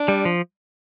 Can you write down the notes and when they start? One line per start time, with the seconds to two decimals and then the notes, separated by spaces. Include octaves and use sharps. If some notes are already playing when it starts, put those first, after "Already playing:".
Already playing: D4
0.08 G3
0.25 F3